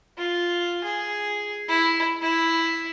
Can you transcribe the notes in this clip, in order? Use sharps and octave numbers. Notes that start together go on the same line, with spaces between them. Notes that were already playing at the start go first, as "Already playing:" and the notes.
F4
G#4
E4
E4